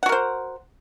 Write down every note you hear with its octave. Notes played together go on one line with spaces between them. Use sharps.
F#4 A#4 C5 F#5